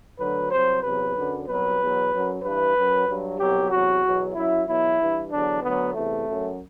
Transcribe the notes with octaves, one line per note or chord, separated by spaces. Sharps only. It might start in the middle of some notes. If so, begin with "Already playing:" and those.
D2 D3 F#3 B4
C2 C3 F#3 C5
E2 C3 F#3 B4
F#2 D3 F#3
C2 B2 F#3 B4
E2 B2 F#3
F#2 F#3
G2 E3 B4
F#2 F#3
G2 F#3
C2 B2 F#3 G4
E2 C3 F#3 F#4
E2 B2 F#3
F#2 F#3 E4
E2 B2 F#3 E4
G2 E3
E2 D3 F#3 D4
D2 D3 F#3 B3
E2 C3 E3 A3
F#2 F#3